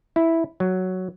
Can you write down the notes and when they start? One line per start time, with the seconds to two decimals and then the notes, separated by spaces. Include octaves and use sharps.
0.16 E4
0.60 F#3